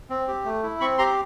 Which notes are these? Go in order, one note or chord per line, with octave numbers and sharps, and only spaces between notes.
C4
G4
A3
E4
C4 B5 C#6
G4 A#5 C6